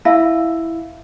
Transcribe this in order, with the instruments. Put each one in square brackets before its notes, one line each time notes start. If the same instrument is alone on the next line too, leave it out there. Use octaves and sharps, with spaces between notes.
[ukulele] E4 [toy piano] E5 F5 A5